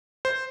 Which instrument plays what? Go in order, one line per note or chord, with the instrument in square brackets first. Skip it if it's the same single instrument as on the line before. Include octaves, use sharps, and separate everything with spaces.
[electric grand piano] C5